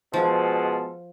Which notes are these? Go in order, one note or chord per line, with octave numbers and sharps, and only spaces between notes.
B2 F3 G#3 B3 F4 A4